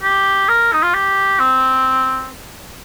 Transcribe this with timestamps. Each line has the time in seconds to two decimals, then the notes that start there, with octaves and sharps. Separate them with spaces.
0.03 G4
0.49 A#4
0.73 D#4
0.83 F4
0.94 G4
1.40 C4